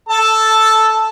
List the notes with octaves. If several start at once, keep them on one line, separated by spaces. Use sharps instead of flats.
A4 A5